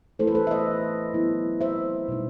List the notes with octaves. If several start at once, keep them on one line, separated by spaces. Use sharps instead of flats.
E3 A3 E4 A4 C5
B4
A4 C5
E5
B4 D#5
F#3 B3 E4
C5 E5
B2 G3 D#4